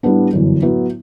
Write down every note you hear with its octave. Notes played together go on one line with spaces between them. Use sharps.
A2 G3 B3 D4
G1 F#2 E3
A2 F#3 B3 E4